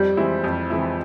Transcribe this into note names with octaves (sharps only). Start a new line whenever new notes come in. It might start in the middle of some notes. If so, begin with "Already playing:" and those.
Already playing: F2 G3
E3 G#3 C4 E4
F2
E3 G#3 C4 E4